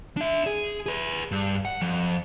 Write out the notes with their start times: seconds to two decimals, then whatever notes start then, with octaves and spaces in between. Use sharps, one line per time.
0.17 D4 E5
0.46 G#4
0.86 G#4 B4
1.31 G2
1.65 F#5
1.82 F2